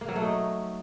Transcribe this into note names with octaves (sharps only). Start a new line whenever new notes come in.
A#3
F#3
A3
D#4